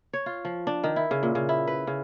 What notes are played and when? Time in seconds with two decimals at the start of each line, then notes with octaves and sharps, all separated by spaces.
0.13 C#5
0.26 F4
0.45 F3
0.67 D4
0.84 D#3
0.96 E4
1.11 C#3
1.23 A#2
1.35 C#3
1.49 E4
1.68 B4
1.87 C#3